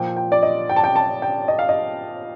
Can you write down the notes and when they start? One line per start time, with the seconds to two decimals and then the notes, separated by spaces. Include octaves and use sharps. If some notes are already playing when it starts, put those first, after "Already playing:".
Already playing: A#2 F3 G5
0.16 G5
0.32 D5
0.43 D#5
0.69 G5
0.76 A5
0.84 G5
0.96 A5
1.22 G5
1.48 D#5
1.59 F5
1.69 D#5